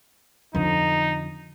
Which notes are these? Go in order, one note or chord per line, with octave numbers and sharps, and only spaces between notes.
F2 D3 D#4